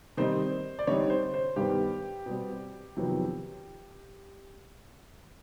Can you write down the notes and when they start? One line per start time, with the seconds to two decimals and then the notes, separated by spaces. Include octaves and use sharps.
0.17 D#3 G3 C4 D#4 C5
0.79 D5
0.87 D3 G3 C4 D#4 C#5
1.10 C5
1.34 C5
1.56 G2 D#3 G3 B3 G4
2.26 B2 G3 C4
2.96 F2 C3 D#3 F#3 B3